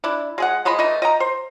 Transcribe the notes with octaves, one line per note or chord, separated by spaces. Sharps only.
D4 E4
G#3 G#4 F#5
F3 G#3 D#5 B5
E3 A3 D#4 D#5
D#5 G5 A#5
C5